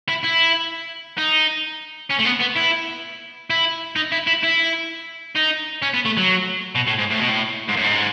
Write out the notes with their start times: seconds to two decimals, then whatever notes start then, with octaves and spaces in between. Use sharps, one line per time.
0.09 E4
0.24 E4
1.18 D#4
2.10 C#4
2.20 A3
2.26 B3
2.41 B3
2.57 E4
3.50 E4
3.96 D#4
4.12 E4
4.27 E4
4.43 E4
5.36 D#4
5.82 C#4
5.94 B3
6.05 A3
6.17 F#3
6.75 B2
6.87 A2
6.98 G#2
7.10 A2
7.19 B2
7.29 A2
7.68 G#2
7.76 F#2
7.84 G#2